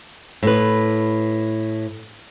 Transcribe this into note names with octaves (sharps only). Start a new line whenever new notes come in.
A2 B4